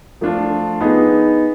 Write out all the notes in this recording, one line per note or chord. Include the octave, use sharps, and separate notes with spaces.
F3 A3 D4 F4
B3 D#4 G#4